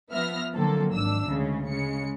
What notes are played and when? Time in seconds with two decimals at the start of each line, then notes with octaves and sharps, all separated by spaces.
0.10 F3 B3 E5 F6 A#6
0.55 D3 F3 F#3 A#3 C4 A4
0.93 G#1 D4 E6
1.27 D2 C#3 G#3
1.68 C#3 G#3 C#7